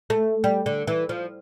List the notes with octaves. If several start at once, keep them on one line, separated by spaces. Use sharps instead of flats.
A3
G3
D3
E3
F3